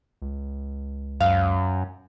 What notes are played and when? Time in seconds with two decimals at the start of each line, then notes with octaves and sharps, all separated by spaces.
0.22 C#2
1.20 F#2 F5